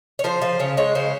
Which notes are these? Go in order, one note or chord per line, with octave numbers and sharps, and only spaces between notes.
C#5
F3 C5
F3 C5
C#3 C#5
G#3 C#5
C#3 C5